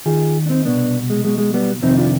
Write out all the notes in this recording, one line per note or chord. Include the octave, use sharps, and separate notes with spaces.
D#2 D#3 F4 G#4
D4
C4 D#4
C2 B2 B3 D4
G#3
B1 B2 G#3
G#3
G3 B3
F2 C3 D#3 C4 D#4
D4 F4